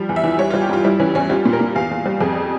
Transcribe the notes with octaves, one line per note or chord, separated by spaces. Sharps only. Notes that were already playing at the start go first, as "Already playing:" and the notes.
Already playing: F3 G3
E2
E5
E3
G3 C#5
G3 F4
G4
G2 F4
G3 E4
E3 C#4
E2 C#4
G3 F4
A#2
A#4
A#2
E2 F5
E2
G3
F2 G#4